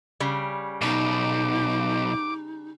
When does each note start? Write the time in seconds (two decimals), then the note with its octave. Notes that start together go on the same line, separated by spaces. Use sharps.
0.20 C#3 G3
0.82 B1 B2 D#4 D6